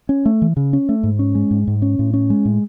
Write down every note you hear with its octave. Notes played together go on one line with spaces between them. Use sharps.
C#4
A3
E3
C#3
C#4
A3
G#2
C#4
G#3
G#2
G#2
C#4
A2
C#4
G#3
A2